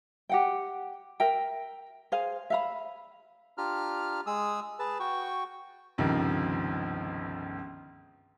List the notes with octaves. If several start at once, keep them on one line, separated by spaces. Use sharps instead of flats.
G4 F#5 G5
A#4 E5 G5
G#4 C5 F5 G#5
E5 F5 B5
D4 F4 G4 A#5 F6
G#3 G#4 D#6 E6
G#4 B4 A5
F#4 G5 C#6
G1 C#2 C3 D#3 F3